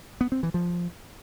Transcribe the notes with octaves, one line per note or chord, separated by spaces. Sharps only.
B3
C4
E3
F3